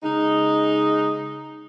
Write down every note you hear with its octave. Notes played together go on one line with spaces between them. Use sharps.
C#3 G#3 D#4